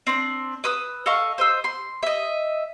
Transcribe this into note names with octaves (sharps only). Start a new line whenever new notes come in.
C4 D4
B4 D#6 E6
A4 D#5 F5 C#6
C5 D#5 E6
C6
D#5 E5